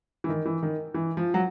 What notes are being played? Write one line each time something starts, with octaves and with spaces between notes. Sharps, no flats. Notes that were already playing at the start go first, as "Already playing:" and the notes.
E3
D#3
E3
D#3
E3
F3
F#3